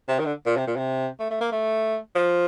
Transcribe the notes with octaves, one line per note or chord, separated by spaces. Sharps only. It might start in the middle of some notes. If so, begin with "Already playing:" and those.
C3
D#3
D3
A#2
C3
A#2
C3
A3
A3
A#3
A3
F3